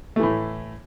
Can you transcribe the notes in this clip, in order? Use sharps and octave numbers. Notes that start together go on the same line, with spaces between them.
A2 E3 A3